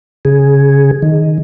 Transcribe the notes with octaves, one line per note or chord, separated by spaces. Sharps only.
C#3 G#4
D#3